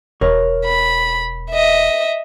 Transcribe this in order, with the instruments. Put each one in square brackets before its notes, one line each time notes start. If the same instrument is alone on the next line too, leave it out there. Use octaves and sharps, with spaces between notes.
[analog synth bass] E1 [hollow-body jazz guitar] A#4 C#5
[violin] B5
D#5 E5